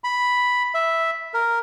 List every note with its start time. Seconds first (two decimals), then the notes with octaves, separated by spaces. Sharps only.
0.04 B5
0.74 E5
1.34 A#4